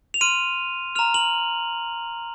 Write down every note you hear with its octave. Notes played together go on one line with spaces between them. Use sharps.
F7
C6 F6 D#7
A#5 F6 F7
F#7